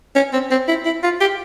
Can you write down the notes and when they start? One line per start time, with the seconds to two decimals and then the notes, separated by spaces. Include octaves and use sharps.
0.16 C#4
0.33 C4
0.51 C4
0.68 E4
0.85 E4
1.03 F4
1.21 G4